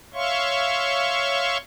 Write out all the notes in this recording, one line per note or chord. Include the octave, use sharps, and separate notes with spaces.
C#5 E5 F5 C6 C#6